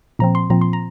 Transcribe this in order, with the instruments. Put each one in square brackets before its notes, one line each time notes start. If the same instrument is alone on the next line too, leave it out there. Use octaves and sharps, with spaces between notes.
[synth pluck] A#2 F3 C4 A#5
C6
A#2 F3 C4 A#5
C6
A#5